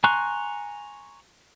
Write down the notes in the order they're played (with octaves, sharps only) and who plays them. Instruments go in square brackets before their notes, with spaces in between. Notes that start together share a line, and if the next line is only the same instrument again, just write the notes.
[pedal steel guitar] G#5 A#5 C6 C#6 F#6